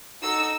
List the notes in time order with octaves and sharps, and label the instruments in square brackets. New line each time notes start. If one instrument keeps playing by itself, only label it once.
[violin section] D#4 F#4 A4 E6